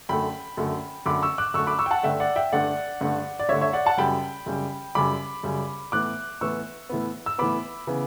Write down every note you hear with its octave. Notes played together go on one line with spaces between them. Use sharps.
F#2 D3 A3 G5 B5
F#2 D3 A3
F#2 D3 A3 B5 D6
C#6 E6
D6 F#6
F#2 D3 A3 C#6 E6
B5 D6
C#6 E6
G5
F#5 A5
G2 D3 A3 E5 G5
D5 F#5
E5 G5
G2 D3 A3 D5 F#5
G2 D3 A3
D5
G2 D3 A3 C#5 E5
C#5 E5
D5 F#5
F#5 A5
F#2 C#3 G3 G5 B5
F#2 C#3 G3
F#2 C#3 G3 B5 D6
F#2 C#3 G3
A2 E3 B3 D6 F#6
A2 E3 B3 C#6 E6
A2 E3 B3
E6
A2 E3 B3 B5 D6
C#3 E3 B3